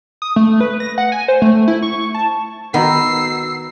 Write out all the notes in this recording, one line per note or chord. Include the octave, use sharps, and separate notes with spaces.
D#6
A3
B4
A#6
F#5
G#5
C5
A3
E4
C#6
A5
D#3 B3 F#4 A#5 B5 E6 C7